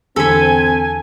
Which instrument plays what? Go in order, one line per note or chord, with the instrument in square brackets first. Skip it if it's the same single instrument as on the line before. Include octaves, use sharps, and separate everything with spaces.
[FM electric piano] E2 D3 E3 [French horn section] C4 [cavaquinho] A4 B5 [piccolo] G#5